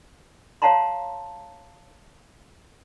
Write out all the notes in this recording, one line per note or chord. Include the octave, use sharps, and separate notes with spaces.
C#5 F5 F#5 A5 A#5 C6